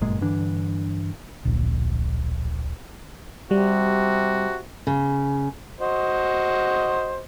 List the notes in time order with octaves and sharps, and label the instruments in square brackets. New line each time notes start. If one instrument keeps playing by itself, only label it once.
[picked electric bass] G1 F#2 A#2 G#3
G2 D3 E3 D4
[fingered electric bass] D1 A#1
[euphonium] C3 [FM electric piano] G3 [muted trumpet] F#4
[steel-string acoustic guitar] C#3
[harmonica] F#4 C5 D#5